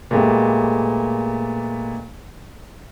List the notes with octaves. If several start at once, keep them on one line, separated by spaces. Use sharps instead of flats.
A#2 G#3 A3 B3 G4